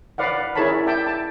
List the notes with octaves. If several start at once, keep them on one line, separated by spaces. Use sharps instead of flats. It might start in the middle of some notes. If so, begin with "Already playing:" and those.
B4 D5 F5 F#5
E4 G#4 A#4 C#5 A5 B5
D5 E5 G5 A5
A5